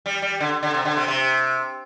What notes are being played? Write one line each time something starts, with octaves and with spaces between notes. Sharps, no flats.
G3
G3
D3
D3
C3
D3
C3
C3